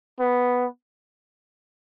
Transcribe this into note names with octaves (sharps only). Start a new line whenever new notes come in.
B3